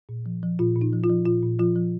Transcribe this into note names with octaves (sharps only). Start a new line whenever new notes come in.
A#2
F3
F3
A#2 F4
A#2
D#4
F3
F4
F3
A#2 F4
A#2
F3 F4
F3